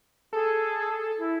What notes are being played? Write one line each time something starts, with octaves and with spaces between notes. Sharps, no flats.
G#4 A4
E4